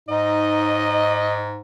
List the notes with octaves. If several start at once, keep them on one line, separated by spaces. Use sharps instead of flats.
G#2 D#4 D#5